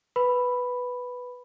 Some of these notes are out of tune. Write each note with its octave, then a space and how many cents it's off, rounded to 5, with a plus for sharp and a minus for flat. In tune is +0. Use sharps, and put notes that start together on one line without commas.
B4 +0 B5 +0